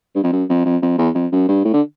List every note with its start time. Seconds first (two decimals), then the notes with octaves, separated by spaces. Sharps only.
0.15 G2
0.24 F2
0.32 F#2
0.49 F2
0.65 F2
0.82 F2
0.98 E2
1.15 F2
1.32 F#2
1.49 G2
1.65 A2
1.74 D3